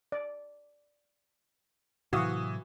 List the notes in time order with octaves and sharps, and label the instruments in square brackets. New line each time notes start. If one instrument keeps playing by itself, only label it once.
[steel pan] D5
[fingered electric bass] A2 C3 F#3 [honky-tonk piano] E3 D#6 [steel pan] F#4 F5